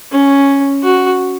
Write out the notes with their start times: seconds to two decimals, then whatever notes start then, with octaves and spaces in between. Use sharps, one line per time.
0.12 C#4
0.83 F#4